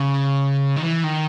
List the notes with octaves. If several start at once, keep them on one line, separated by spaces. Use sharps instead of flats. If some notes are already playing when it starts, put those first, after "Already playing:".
Already playing: C#3
D#3
E3
D#3